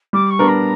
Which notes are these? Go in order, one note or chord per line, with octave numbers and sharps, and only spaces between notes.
G3 D6
C#6
B3 D4 A#4
A#5